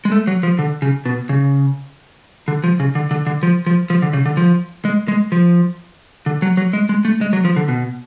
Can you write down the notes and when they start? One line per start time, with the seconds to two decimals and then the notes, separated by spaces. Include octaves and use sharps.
0.05 G#3
0.12 A3
0.27 F#3
0.43 F3
0.59 D3
0.82 C#3
1.05 B2
1.29 C#3
2.48 D3
2.64 F3
2.80 C#3
2.95 D3
3.11 D3
3.27 D3
3.43 F3
3.66 F3
3.90 F3
4.02 D3
4.13 C#3
4.26 D3
4.37 F3
4.85 G#3
5.08 G#3
5.32 F3
6.26 D3
6.42 F#3
6.57 F#3
6.73 G#3
6.89 G#3
7.05 A3
7.21 G#3
7.33 F#3
7.45 F3
7.56 D3
7.68 B2